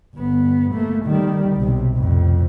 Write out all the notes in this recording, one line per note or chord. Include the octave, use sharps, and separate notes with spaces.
G1 B3
A3 A#3
D#3 G3
B1 C3
F2 A2